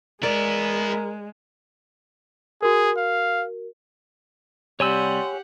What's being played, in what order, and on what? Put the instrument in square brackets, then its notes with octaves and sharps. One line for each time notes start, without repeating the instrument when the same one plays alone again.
[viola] G#3 [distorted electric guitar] B3 E4 [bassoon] A#4 [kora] D5
[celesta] F#4 A#4 [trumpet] G#4
[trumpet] F5
[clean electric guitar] C3 G3 [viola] G4 F#5 [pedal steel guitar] C#5 G#5 E6 [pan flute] C6